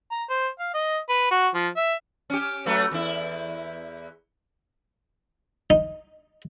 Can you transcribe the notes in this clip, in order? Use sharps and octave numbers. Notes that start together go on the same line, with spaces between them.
A#5
C5
F5
D#5
B4
F#4
F3
E5
C#4 G4
F#3 A3 B4
E2 E4
D#4